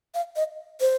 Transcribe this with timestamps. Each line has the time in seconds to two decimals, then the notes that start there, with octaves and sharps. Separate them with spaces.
0.15 F5
0.36 D#5
0.81 C5